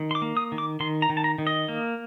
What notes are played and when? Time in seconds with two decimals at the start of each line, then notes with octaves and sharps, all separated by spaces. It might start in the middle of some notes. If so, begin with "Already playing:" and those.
Already playing: D#3
0.11 C6
0.15 D6
0.22 A#3
0.37 D#6
0.52 D#3
0.58 D6
0.80 D#3 C6
1.02 A#5
1.10 D#3
1.17 A5
1.24 A#5
1.38 D#3
1.47 D#5
1.68 A#3